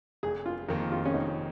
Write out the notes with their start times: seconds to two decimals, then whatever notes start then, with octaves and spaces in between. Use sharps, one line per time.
0.23 F1 G#4
0.46 F4
0.68 F2 D#3 A#3 A#4
0.92 F4
1.05 C#4
1.14 F1 D#4